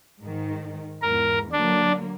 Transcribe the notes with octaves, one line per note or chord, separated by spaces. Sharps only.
G#2 D#3
E2 G#2 A#4
D3 F#3 A#3 D4